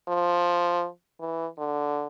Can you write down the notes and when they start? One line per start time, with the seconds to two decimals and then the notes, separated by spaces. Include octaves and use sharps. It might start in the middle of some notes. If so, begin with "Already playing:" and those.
0.08 F3
1.20 E3
1.58 D3